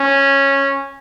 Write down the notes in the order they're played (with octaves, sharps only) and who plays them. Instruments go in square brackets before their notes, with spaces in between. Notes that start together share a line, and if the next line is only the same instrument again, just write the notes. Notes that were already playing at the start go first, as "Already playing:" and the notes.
Already playing: [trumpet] C#4